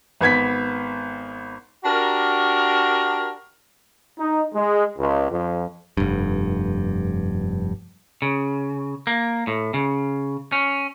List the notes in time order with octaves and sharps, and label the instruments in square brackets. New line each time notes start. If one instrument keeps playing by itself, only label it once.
[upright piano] G#1 B3 G#6 B6
[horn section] D4 F#4 G4 A#4
[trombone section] D#4
G#3
C#2
F2
[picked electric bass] F1 G2
[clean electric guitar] C#3
A#3
A2
C#3
C#4